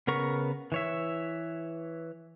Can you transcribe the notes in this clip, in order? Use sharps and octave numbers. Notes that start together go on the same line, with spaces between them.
C#3 B3 A#4 C#6
E3 C#5 E5